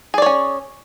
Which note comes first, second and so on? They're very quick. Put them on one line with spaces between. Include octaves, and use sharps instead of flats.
G#4 D5 C#5 C#4